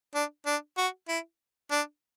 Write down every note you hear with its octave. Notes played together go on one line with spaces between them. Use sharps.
D4
D4
F#4
E4
D4